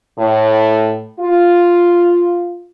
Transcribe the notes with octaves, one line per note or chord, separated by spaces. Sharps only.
A2
F4